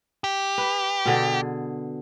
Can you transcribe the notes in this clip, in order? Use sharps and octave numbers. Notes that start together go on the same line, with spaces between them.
G4
B4
B2 D3 G#4